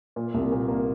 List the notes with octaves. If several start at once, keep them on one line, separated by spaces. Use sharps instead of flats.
A#2
C2
A#2
A#3